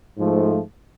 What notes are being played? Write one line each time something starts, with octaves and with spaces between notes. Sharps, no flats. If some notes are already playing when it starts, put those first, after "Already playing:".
G#2 F3 A3